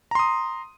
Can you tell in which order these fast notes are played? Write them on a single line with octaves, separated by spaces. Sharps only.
A#5 C6 D#6